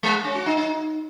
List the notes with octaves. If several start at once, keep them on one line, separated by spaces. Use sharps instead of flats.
G#3
C#4
F#4
D#4
D#4